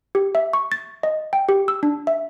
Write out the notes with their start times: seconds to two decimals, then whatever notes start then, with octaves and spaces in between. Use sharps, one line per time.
0.15 G4
0.35 E5
0.53 C#6
0.72 A6
1.03 D#5
1.33 G5
1.49 G4
1.68 E6
1.83 D4
2.07 E5